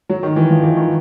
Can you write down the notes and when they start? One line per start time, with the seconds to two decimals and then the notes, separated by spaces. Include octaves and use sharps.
0.09 F#3
0.23 D#3
0.36 E3
0.50 F3
0.63 E3
0.77 D#3